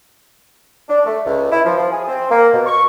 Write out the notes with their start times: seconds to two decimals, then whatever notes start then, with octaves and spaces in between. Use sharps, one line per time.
0.89 D4
1.06 A3
1.26 C#2
1.51 E4
1.65 F3
1.78 F3
1.92 G#4
2.07 C4
2.30 A#3
2.53 B2
2.66 C#6